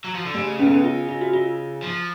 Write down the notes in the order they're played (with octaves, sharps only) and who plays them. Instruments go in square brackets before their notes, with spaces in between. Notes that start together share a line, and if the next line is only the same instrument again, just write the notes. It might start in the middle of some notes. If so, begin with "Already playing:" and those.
[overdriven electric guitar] F#3
F3
D3
[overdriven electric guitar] C#3 [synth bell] A3
[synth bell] C#4
B3
C#4
F4
F4
F#4
F4
[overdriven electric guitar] F3